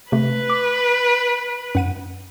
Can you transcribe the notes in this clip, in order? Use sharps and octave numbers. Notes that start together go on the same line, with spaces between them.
C3 A3 B4
D6
F#2 F#5 D#7